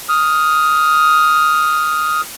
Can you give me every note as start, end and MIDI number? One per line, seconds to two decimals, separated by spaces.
0.09 2.21 87
0.09 2.21 89